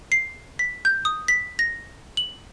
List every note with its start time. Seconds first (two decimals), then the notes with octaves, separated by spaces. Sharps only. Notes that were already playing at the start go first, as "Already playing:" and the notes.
0.12 C7
0.59 B6
0.85 G6
1.05 D#6
1.28 B6
1.59 A#6
2.17 F#7